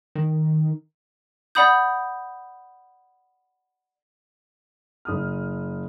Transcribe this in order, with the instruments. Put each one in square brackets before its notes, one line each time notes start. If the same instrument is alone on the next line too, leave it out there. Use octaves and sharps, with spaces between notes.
[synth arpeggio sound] D#3
[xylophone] D5 F#5 B5 D#6 G6
[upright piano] F#1 D#6 F6